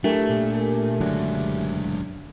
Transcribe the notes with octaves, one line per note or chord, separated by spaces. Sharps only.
F#3 A3 D4 E4 G4 A#4 G#5
A#2
F#1 D3 F#3 G#3 D4